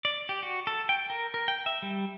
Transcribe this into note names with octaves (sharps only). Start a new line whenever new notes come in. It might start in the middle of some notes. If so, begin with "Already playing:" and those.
D5
G4
F#4
A4
G5
A#4
A#4
G5
E5
G3